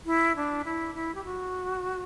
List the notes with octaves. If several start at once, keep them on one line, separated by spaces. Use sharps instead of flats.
E4
D4
E4
E4
G4
F#4